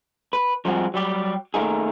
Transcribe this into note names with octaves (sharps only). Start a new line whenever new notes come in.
B4
F3 G3 G#3 C4 F#4 G#4
F#3 G3 G4
D#3 A3 A#3 D#4 G#4